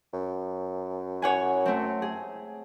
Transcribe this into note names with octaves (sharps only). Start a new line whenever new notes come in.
F#2
C#5 F#5 G#5
A3 C4
G#4